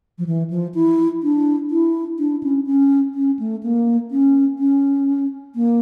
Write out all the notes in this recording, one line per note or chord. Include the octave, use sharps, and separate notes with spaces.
F3
E3
F3
E4
D4
E4
D4
C#4
C#4
C#4
A3
A#3
C#4
C#4
A#3